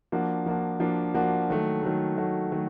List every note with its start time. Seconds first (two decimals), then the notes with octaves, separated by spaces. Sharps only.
0.12 F3 A#3 D4 F#4
0.46 F3 A#3 D4 F#4
0.80 F3 A#3 D4 F#4
1.14 F3 A#3 D4 F#4
1.50 D#3 F#3 A3
1.83 D#3 F#3 A3
2.17 D#3 F#3 A3
2.52 D#3 F#3 A3